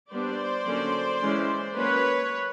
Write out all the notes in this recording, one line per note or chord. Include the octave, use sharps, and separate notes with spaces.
G3 B3 D4 C5 D5
D3 F#3 A#3 C#4
E3 G#3 C#4
F#3 A#3 C#4 B4 C#5